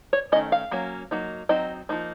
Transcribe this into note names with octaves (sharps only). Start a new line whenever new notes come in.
C#5
D#3 A3 C#4 D#5
F5
F#3 A#3 C#4
F#3 A#3 D#4
F#3 C4 D#4 D#5
F3 A#3 D#4